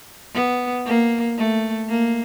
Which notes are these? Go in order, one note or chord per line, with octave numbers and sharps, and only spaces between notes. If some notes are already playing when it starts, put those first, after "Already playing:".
B3
A#3
A3
A#3